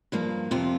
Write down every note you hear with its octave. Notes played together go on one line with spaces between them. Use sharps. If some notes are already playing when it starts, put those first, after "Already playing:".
G2 F3 A#3
F2 C3 F3 C4 F4